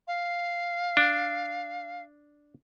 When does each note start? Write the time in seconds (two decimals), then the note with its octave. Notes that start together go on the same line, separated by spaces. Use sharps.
0.07 F5
0.97 D4